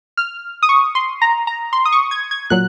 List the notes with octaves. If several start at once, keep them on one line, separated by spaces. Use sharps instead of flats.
F6
D#6
C#6
C6
A#5
A#5
C6
D#6
C#6
G#6
G#6
A#2 F#3 F#6